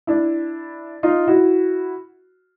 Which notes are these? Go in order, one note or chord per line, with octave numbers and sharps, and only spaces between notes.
D4 E4
D#4 F4
E4 F#4